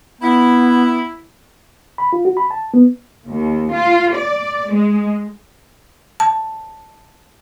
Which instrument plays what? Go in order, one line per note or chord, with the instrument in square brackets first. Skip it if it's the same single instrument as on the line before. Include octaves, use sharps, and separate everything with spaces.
[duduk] B3 [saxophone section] E4
[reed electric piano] B5
F4
F#4
B5
A5
B3
[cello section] D#2
F4
D5
G#3
[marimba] A5